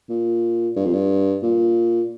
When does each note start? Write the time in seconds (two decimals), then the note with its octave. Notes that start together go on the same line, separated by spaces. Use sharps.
0.09 A#2
0.76 G2
0.85 F2
0.94 G2
1.43 A#2